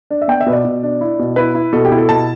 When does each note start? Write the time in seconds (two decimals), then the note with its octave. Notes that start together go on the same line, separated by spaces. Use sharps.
0.10 D4
0.22 E5
0.28 B3 G5
0.41 E5
0.46 B2 B4
0.53 D5
0.64 B2
0.83 D4
1.01 E4
1.19 B2
1.36 E4 B4
1.55 E4
1.73 B2 A4
1.85 G4
1.92 E4
1.98 A4
2.09 B2 A5